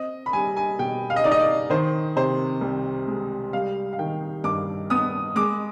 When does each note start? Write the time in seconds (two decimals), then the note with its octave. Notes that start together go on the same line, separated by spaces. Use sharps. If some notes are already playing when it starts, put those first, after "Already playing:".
Already playing: C4 D#5
0.26 B5
0.33 G3 G#5
0.57 G#5
0.79 B2 G5
1.10 F5
1.16 D#5
1.24 D#4 D5
1.31 D#5
1.39 D5
1.70 D#3 C5
2.16 C3 C5
2.61 C2
3.08 G#3
3.53 G3 F5
3.93 F5
3.99 D#3 G5
4.44 G2 D6
4.90 B3 D#6
5.35 G#3 D6